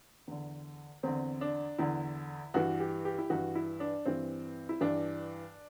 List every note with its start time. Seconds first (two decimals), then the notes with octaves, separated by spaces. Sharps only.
0.28 E2 D3
1.03 E2 D3 C4
1.41 D4
1.78 E2 D3 E4
2.54 G2 E3 F#4
2.80 G4
3.05 G4
3.18 E4
3.30 G2 E3 F#4
3.55 E4
3.80 D4
4.06 G2 E3 C4
4.69 E4
4.81 G2 E3 D4